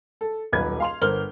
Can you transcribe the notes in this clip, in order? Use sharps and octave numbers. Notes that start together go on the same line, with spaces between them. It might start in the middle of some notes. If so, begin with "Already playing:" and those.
A4
D#1 B1 B4 G#6
F5 C6 F7
G1 A#4 C5 F6 G7